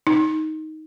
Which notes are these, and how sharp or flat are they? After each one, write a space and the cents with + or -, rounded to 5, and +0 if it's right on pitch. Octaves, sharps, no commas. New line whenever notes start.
D#4 +10